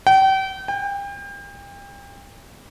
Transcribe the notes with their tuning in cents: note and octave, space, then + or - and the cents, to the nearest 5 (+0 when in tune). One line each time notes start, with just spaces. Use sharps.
G5 -35
G5 +35